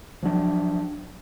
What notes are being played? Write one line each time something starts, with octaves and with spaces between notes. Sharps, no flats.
F3 F#3 D4